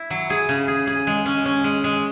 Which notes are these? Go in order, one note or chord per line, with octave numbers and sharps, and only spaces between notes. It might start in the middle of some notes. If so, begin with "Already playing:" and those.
Already playing: E4
F#3
G#4
C#3
G#4
G#4
G#3
C#4
C#4
G#3
G#3